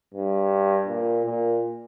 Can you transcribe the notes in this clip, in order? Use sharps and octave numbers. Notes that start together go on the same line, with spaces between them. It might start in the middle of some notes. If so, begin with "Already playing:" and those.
G2
A#2
A#2